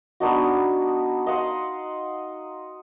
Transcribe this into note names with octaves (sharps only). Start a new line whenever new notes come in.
B3 D4 D#4 F#4
D#5 F5 F#5 C6